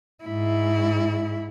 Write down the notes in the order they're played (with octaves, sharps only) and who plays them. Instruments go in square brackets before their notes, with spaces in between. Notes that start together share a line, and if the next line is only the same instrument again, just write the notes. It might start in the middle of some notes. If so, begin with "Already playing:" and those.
[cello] G#2 E4